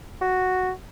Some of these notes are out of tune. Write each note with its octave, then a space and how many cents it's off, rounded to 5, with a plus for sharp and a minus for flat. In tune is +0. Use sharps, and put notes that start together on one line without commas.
F#4 +0